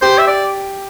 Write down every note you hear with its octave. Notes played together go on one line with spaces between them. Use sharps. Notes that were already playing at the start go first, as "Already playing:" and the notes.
G4 C5
E5
D5